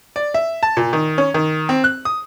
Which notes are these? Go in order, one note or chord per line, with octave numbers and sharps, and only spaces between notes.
D5
E5
A5
A#2
D#3
C#4
D#3
C4
F#6
D#6